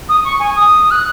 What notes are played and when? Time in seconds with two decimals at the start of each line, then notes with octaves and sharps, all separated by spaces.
0.09 D#6
0.24 C#6
0.39 G#5
0.55 D#6
0.91 F#6